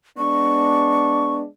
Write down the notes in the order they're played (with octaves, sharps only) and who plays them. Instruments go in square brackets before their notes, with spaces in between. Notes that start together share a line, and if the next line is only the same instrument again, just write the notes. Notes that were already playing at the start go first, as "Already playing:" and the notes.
[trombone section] G#3 B3 D4 [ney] C#6